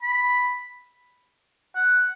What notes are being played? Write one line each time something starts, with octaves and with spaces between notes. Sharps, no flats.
B5
F#5